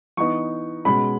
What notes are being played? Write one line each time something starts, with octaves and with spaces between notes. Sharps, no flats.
E3 B3 D#4 C#6
B2 G#3 C#4 B5